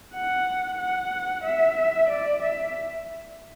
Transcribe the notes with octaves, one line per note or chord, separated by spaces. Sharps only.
F#5
F#5
E5
D5
E5